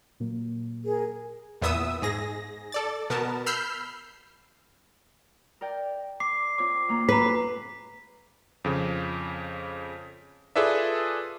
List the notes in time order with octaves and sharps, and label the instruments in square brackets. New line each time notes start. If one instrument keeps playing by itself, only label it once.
[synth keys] A#2 F#3 A#3
[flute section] G#4 A#4
[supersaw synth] E2 A#2 B3 E5 D#6 E6
G#2 G#4 A#6
A4 D5 A6
B2 B3 A#4 A5
B5 E6 F6 G6 C7
[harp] A#4 D5 G5
[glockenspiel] D6 C7
[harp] C4 F4 C#5 [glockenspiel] D6
[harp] D2 A#3 A#5
[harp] F#2 [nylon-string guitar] B4 [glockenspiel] A#5 B6
[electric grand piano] F2 C#3
F4 G#4 A4 B4 D5 E5